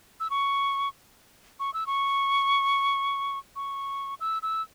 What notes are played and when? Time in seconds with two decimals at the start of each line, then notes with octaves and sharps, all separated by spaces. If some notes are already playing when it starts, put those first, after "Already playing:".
0.20 E6
0.30 C#6
1.60 C#6
1.74 E6
1.87 C#6
3.56 C#6
4.20 E6
4.42 E6